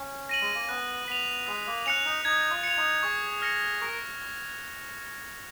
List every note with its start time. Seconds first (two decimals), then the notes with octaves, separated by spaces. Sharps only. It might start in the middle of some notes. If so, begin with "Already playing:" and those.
Already playing: C#4
0.29 A#6 D#7 F#7
0.41 G#3
0.55 A#3
0.69 B3 F#6
1.08 B3 B6 F7
1.46 G#3 D#6
1.66 A#3
1.86 C#4 F#6 C#7 F7
2.05 D#4
2.25 D#4 G#6
2.51 F4
2.63 C#7 F7
2.77 D#4
3.03 G#4 C#6
3.42 F6 A#6 C#7
3.81 A#4 C#6